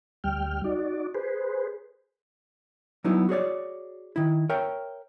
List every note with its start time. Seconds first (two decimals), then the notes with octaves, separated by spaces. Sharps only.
0.24 D2 G3 G5 F6
0.64 D#4 F#4 D5
1.15 G#4 B4 C5
3.04 F#3 G3 B3 D#4 E4
3.29 F#4 G#4 C#5 D5
4.16 D#3 E4
4.50 A#4 C#5 E5 G5